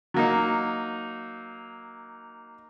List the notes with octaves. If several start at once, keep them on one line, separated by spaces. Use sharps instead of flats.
F#3 A#3 D#4